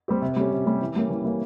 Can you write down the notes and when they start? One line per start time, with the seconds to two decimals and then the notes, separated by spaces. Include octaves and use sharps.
0.08 G3 C4 G4
0.22 C3
0.36 G3 C#4 G4
0.52 C3
0.66 G3 C#4 G4
0.81 E3
0.96 G3 A#3 C#4
1.10 E3
1.24 G3 A#3 C#4